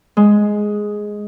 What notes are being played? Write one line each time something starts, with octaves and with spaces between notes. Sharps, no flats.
G#3